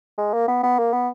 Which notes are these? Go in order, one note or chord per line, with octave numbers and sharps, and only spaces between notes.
G#3
A#3
B3
B3
A#3
B3